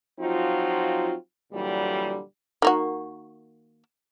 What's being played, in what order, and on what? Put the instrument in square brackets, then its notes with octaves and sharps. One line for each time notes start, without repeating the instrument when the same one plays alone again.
[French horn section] F3 F#3 C4 D#4 F4 F#4
A#2 D3 E3 F#3 G3
[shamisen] D#3 A#3 F#4